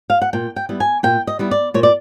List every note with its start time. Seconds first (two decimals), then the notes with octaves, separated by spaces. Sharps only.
0.10 F5
0.22 F#5
0.33 A#2 G5
0.56 G5
0.69 G3 B3 E4
0.80 G#5
1.03 A#2 G5
1.27 D#5
1.39 G3 B3 E4
1.51 D5
1.74 A#2 C#5
1.83 D5